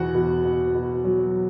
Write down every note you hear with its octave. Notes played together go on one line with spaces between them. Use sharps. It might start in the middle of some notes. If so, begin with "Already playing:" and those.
Already playing: E2 B2 F#4 F#5
B2
B2
B2
F#3